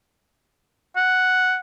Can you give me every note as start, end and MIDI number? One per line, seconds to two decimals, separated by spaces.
0.96 1.59 78